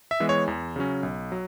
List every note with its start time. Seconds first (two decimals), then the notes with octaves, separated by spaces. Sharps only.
0.11 E5
0.20 E3 G#3 B3
0.29 C#5
0.48 E2
0.76 C#3 F#3 C#4
1.03 B1
1.32 F#3